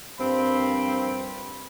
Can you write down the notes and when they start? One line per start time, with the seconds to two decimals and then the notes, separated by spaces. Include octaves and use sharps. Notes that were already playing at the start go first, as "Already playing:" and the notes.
0.20 G2 F3 A#3 C4 B5